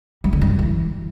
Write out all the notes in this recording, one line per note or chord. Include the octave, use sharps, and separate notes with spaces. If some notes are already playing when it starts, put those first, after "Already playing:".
G3
D3
G2
F#2
E3